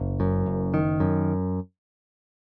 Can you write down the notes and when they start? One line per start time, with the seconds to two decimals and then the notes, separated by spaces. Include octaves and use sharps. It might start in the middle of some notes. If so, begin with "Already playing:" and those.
Already playing: F#1
0.20 F#2
0.46 F#1
0.74 D#3
1.00 F#2